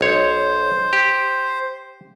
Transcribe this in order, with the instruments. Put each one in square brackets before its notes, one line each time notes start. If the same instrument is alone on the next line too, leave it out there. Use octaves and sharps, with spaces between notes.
[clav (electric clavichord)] B1 C#5 [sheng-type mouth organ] C5
[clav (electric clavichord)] G4